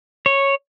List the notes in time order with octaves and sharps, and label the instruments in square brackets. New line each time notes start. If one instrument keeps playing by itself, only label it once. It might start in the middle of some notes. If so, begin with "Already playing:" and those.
[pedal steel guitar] C#5